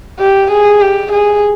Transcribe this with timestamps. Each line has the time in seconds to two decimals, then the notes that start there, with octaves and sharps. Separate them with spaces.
0.19 G4
0.51 G#4
0.81 G4
1.12 G#4